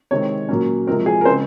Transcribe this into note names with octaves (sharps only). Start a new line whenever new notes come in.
C3 D#3 G#3 C4 C#5
A#2 F#3 A#3 C#4
C3 F3 G#3 C4 A#4
G#4
A#4
C#3 G#3 C4 C5